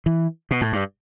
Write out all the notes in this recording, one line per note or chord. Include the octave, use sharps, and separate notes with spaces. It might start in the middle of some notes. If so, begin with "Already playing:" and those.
E3
B2
A2
G2